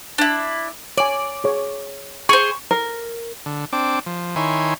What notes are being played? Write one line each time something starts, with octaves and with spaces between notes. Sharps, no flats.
D4 E4
C#5 D5 G#5
G#4 C#5
G#4 C5 C#6
A#4
D3
C4 D4 D6
F3
D#3 E4 C#5 G#5 C6